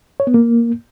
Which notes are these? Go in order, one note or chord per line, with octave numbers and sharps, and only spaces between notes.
C#5
B3
A#3